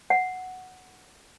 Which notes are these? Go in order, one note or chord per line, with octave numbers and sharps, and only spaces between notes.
F#5